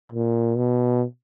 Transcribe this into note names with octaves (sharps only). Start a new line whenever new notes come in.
A#2
B2